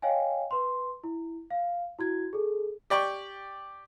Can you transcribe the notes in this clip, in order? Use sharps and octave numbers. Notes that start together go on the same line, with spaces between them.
C#5 D#5 F5 G5 G#5
B4 C6
E4
F5
E4 F#4 G#6
G#4 A4
G4 D5 G5 C#6